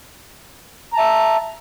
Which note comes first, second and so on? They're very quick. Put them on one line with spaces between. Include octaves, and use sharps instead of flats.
A#5 A5 E5